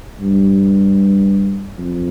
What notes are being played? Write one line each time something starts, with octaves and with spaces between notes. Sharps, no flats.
G2
F2